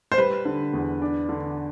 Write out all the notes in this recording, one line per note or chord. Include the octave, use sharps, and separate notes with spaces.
C5
G3 B4
D3
E2
D4
D3